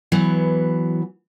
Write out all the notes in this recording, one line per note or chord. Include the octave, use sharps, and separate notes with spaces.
E3 F#3 B3